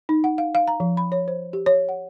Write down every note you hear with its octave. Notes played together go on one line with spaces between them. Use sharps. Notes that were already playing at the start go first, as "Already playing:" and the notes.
D#4
F#5
F5
F5
A#5
F3
B5
C#5
C5
G4
C#5
F#5